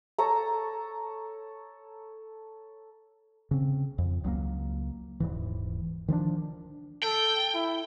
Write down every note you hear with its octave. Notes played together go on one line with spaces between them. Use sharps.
A4 C#5 A#5
C#3 C4
F2
C#2 F#3 G#3 A#3
D#1 G#2 E3
D#3 F3 C4 D4
A4 G5
E4